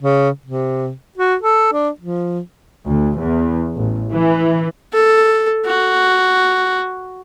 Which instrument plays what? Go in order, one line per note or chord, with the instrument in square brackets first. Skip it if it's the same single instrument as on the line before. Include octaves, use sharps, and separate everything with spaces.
[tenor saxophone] C#3
C3
F#4
A4
D4
F3
[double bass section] D2
E2
A1
E3
[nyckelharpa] A4
F#4